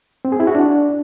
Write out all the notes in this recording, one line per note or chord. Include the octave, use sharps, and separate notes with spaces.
C4
G#4
E4
F#4
D4